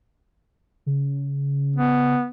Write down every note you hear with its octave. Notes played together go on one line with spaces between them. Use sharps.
C#3
B3